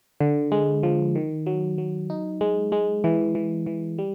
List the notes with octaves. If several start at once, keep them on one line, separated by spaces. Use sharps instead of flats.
D3
G#3
F3
D#3
F#3
F#3
D#4
G#3
G#3
E3
E3
E3
G3